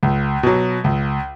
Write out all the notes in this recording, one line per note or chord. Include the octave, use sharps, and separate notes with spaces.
C#2
B2 F#3
C#2